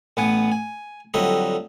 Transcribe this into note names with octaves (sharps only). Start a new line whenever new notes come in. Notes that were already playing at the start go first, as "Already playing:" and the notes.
A1 B3 F#5 G#5
G#5
F2 D3 F#3 G3 D#5 E5